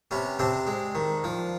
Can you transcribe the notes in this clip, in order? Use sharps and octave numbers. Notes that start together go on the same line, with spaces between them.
C3 B3 C#4
C3 C4 D4
G#3
D#3
F3